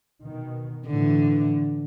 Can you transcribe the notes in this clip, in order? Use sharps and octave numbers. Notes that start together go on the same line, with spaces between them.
B2 D#3
A2 D3 E3